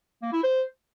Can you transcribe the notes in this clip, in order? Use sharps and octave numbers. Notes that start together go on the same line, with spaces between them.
A#3
E4
C5